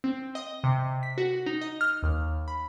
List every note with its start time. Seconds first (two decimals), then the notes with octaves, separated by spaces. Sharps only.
0.04 C4
0.35 D#5
0.64 C3
1.03 B6
1.18 F#4
1.46 D#4
1.61 D#5
1.81 F6
2.03 D#2
2.48 B5